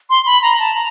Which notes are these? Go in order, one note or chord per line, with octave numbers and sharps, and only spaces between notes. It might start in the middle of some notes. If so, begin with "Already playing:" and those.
C6
B5
A#5
A5
A#5